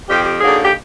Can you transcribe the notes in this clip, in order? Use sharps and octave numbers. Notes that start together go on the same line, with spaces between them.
F2 G4
G4
D3 F#3 A#3 D#4 G#4
G4